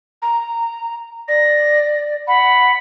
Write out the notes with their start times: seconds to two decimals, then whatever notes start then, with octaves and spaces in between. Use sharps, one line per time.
0.22 A#5
1.28 D5 A#6
2.27 F#5 B5